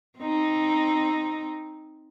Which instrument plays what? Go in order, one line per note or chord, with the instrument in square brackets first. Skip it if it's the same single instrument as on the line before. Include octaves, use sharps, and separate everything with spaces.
[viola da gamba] C4 D#4